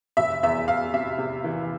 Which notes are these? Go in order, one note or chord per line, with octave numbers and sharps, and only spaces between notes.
F1 E5
E2 E5
E2 F5
C3 E5
C3
E3